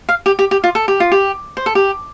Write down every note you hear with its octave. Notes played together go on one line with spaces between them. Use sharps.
F5
G4
G4
G4
F4
A4
G4
F4
G4
C5
A4
G4